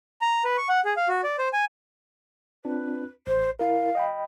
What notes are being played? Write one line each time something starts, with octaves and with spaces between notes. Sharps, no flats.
A#5
B4
C#6
F#5
G#4
F5
F#4
D5
C5
G#5
C4 D4 F4 B4
A1 C5
E4 A#4 F5
D#5 G5 B5